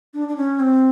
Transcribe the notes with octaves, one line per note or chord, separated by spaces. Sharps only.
D4
D4
C#4
C4